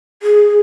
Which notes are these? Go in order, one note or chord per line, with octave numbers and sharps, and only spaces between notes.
G#4